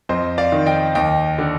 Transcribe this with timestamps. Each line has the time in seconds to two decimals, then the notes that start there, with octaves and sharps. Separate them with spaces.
0.09 F2 C5 D#5
0.38 D5 F5
0.52 D#3
0.66 D#5 G5
0.95 D#2 D#5 G5
1.38 D3